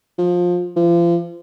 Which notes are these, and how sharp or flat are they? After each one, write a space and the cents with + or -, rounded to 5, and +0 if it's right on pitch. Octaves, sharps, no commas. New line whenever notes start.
F3 +20
F3 -35